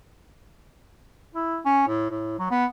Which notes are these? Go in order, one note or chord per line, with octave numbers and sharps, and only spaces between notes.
E4
C#4
A2
A2
F#3
B3